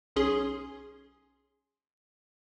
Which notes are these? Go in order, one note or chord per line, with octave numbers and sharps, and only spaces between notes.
B1 C#4 G#4 C6